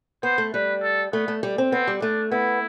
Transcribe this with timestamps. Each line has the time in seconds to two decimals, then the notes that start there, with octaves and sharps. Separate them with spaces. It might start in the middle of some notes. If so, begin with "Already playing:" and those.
0.23 B3 C5
0.38 A3
0.54 G3 B4
0.83 A4
1.13 A3 B3
1.28 A3
1.43 G3
1.58 C4
1.72 B3 C4
1.88 G3
2.02 A3 D4
2.32 B3 E4